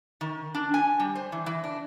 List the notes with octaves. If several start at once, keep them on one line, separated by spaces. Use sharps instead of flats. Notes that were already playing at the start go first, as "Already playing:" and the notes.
D#3
D4
G#5
G3
C5
E3
E3
D4